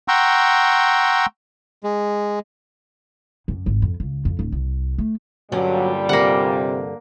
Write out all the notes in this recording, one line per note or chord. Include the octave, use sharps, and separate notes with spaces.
F#5 G5 A#5 C6 C#6 E6
G#3
F#2
G#1
F2
C#2
F2
D1
C2
A3
G2 A#2 D3 F#3 G3 C#4
C3 A#3 F#5